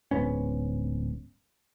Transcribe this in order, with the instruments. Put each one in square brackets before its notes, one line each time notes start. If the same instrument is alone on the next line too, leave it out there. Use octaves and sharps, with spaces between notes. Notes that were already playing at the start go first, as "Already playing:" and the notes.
[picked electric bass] D1 G#2 B3 C#4